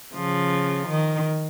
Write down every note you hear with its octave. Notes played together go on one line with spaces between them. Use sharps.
C#3 F3
D#3